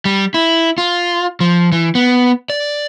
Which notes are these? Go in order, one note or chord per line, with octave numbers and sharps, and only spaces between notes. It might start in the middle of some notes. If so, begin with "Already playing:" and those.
G3
E4
F4
F3
E3
B3
D5